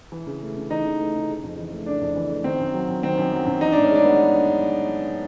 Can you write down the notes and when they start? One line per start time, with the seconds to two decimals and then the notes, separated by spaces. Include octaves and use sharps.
0.12 E3
0.27 C#3
0.42 A3
0.56 C#3
0.70 E3 D#4
0.85 C#3
1.00 A3
1.14 C#3
1.29 C#3
1.43 F2
1.58 E3
1.72 A3
1.86 C#3 D4
2.01 F2
2.16 E3
2.30 A3
2.44 D#3 C4
2.59 F#2
2.74 F#3
2.88 F#2
3.03 D#3 C4
3.18 F#2
3.32 F#3
3.46 F#2
3.61 E3 D#4
3.72 A2 D4
3.84 C#4
3.90 G#3 D4
4.04 B3